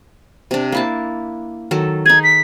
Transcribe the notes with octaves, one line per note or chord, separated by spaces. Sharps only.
C3 D4
A#3 E4 A5
D#3 F#3 A4
D#4 G#4 G#6
B6